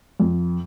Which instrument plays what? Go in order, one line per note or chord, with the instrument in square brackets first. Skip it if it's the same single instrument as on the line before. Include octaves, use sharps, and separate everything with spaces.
[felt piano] F2